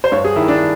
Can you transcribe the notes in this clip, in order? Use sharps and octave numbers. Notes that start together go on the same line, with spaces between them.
C5
G2 C#5
G#4
D#3 E4
D4